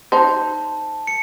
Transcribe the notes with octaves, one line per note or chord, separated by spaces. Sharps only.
D#4 C5 A5
C#7